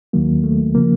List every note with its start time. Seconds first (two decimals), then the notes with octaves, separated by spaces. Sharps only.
0.13 D#2 D#3 F#3 A#3
0.44 A3
0.75 C#3 F3 A#3